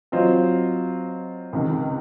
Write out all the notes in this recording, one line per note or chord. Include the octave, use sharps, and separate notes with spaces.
F#3 C4 F4 C5 D#5
C#2 C3 D#3